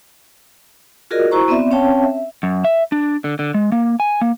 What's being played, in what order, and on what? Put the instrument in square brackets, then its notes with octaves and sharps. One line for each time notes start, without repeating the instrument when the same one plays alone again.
[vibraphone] F4 F#4 G#4 A#4 D5 D#5
E4 F#4 C5 A#5 C#6
B3 C4 D5 E5
C4 C#4 C#5 F5 G5 A5
E5
[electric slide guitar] F#2
E5
D4
D3
D3
G#3
A#3
G#5
A#3